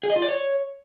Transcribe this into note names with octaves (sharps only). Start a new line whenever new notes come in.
G#4
D#5
F4
D5
C#5